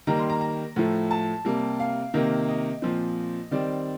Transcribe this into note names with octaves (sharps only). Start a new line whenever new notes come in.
D#3 G3 A#3 A#5
C6
A#5
A#5
A2 F3 A3
A5
C3 G3 A#3
F5
C3 D#3 A#3
D#5
A#2 F3 C4
D#3 G3 C4 D5